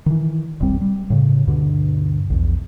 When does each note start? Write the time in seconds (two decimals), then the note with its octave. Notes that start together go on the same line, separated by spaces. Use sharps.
0.06 D#3 E3
0.60 E1 A#1 G3 C4
0.81 G3
1.10 A2 C#3
1.47 D2 G2 B2 D3
2.30 A#1 E2